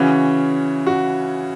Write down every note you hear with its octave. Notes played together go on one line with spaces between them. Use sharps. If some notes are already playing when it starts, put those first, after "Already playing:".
Already playing: C#3 E3 C#4 F#4
F#4